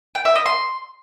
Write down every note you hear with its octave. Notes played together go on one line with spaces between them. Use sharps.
G5
E5
D#5
C6